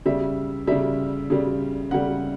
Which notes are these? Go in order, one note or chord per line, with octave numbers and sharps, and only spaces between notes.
C#3 G3 E5
C#3 G3 E5
C#3 G3
C#3 G3 F#5